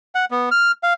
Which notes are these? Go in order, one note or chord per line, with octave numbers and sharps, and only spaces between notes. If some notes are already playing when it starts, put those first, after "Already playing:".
F#5
B3
F6
F5